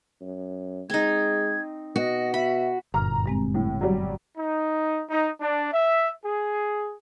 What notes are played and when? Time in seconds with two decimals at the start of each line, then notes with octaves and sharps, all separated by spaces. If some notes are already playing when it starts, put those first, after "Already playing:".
0.21 F#2
0.90 G#3 C4 D#4 G#6
1.96 B2 F#4 D#5
2.34 E5 B5
2.94 G1 F#2 A#2 A#5 F6
3.26 G2 G#3 C4
3.54 A2
3.81 F#3 G3
4.37 D#4
5.10 D#4
5.40 D4
5.72 E5
6.24 G#4